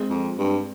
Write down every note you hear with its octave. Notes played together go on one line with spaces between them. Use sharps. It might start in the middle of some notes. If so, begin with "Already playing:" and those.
Already playing: G#3 C4
F2
G2